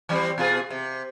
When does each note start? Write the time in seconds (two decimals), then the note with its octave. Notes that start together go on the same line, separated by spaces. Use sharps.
0.09 E3 G3 C4
0.38 B2 F4 G#4
0.70 C3